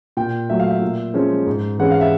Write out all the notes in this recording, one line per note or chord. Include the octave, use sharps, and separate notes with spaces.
A#2 G5
F#3 A3 E5
F5
E5
A#2
F3 G#3 C#4
G#2
E3 G#3 C#4 F#5
F5
E5